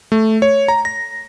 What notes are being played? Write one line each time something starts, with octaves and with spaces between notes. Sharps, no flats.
A3
C#5
A#5
A#6